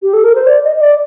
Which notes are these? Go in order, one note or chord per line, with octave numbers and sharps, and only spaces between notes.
G4
A4
A#4
C5
D5
D#5
D#5
D5